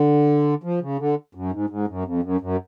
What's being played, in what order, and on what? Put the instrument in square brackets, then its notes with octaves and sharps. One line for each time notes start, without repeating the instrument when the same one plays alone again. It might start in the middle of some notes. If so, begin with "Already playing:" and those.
Already playing: [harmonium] D3
F3
C#3
D3
F#2
G#2
G#2
F#2
F2
F#2
F#2